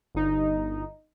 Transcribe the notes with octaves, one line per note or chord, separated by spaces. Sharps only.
G1 D#4